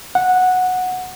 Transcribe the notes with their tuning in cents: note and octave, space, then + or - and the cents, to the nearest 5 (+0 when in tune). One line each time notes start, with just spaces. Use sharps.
F#5 -10